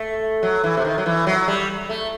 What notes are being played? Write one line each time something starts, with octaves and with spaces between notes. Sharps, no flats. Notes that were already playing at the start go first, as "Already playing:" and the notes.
Already playing: A3
F#3
E3
C3
D#3
F#3
E3
F#3
G3
A3